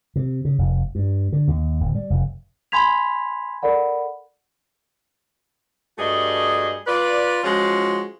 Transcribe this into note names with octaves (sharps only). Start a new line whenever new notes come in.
C3
C#3
F1
G2
D3
D#2
D1
G3
F1
G#5 B5 C6 G#6 B6 F7
A4 A#4 D5 F#5 B5
G2 A3 F#4 G#4 D5 D#5
F4 B4 D5
F3 G#3 C#4 F4 F#4